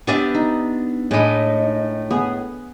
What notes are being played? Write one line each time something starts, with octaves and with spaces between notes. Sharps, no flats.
B3 D4 G4 E5 G#5
D#4
A2 G#3 D4 D#4 B5
B3 G#4